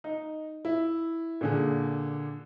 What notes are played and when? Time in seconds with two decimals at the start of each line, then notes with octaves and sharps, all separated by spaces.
0.04 D#4
0.65 E4
1.41 A#2 D3 G#4